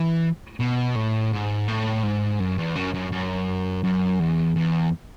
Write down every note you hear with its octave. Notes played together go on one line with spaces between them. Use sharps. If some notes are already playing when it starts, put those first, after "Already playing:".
Already playing: E3
B2
A2
G#2
A2
G#2
F#2
E2
F#2
F#2
F#2
F#2
E2
E2